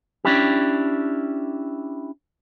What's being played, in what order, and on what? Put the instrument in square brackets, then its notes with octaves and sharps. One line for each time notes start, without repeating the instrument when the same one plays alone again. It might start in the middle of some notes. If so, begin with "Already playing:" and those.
[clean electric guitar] C#4 D4 E4 G4